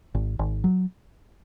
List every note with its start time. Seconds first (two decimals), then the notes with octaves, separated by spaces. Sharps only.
0.15 G#1
0.39 G#1
0.64 F#3